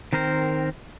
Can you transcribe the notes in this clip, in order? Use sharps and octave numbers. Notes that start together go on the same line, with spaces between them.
D#3 C4 A#4 C5